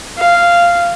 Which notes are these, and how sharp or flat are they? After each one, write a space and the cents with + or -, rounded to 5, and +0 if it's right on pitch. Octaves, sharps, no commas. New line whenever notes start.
F5 -10